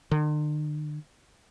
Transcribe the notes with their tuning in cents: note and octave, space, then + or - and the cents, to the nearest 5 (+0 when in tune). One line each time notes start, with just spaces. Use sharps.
D3 +45